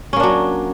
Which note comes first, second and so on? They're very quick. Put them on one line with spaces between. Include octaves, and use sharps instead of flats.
C#4 A#3 D4 F#3